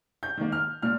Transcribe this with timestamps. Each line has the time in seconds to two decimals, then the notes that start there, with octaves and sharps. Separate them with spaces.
0.23 G6
0.37 D#3 A#3
0.52 F6
0.82 A#2 F6